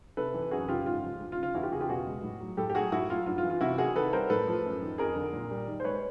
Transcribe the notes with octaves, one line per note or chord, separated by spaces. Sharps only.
C3 A4 B4
E3
F#2 F#4 G#4
C#3 F4 G4
G#2 F4
F3
D2
F4
C#3
F4
E2 E4 F#4
F4 G4
C#3 F#4 G#4
F4 G4
B2 F#4 G#4
G#3
A2
F#3
A2 G4 A4
G4
F#3 F#4 G#4
A2 E4 F#4
F#3 F4
G2 F4
F4
E3
F4
C3 E4 F#4
D#3 F#4 G#4
D#3 A4 B4
G3 A#4 C5
A2 A4 B4
F3
F#2
D#3
F2 G#4 A#4
D3
A#2
G3
D#3
C5
G#3 B4 C#5